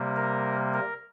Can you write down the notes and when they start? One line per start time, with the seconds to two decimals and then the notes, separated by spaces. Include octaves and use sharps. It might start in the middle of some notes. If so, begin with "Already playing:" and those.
Already playing: C3 G3 A#3
0.16 A#4
0.74 A#4